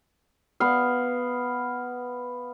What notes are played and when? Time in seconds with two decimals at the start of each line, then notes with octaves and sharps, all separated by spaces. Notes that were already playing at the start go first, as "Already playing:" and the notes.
0.60 B3 F5